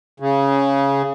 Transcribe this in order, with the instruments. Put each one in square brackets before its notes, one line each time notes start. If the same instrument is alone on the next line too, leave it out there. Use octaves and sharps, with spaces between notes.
[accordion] C#3